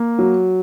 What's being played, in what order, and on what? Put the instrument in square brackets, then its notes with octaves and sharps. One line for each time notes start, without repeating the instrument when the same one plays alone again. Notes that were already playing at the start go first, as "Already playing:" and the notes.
Already playing: [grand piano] A#3
F#3